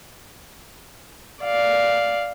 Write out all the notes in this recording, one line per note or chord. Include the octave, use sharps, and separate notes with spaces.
D5 F5